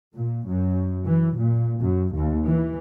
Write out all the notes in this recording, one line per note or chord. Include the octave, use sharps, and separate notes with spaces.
A#2
F#2
E3
A#2
F#2
D#2
E3